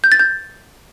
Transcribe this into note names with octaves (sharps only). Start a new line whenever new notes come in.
G6
A6
G6